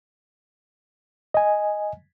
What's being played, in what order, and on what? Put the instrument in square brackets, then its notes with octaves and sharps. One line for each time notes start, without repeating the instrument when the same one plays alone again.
[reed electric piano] D#5 G#5